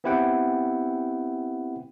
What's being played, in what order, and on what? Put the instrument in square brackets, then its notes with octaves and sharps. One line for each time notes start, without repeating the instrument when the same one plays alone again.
[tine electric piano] B3 C4 E4 G4 F#5 G5